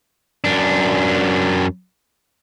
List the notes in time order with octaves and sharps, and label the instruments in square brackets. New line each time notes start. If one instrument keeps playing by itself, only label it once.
[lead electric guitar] F#2 D4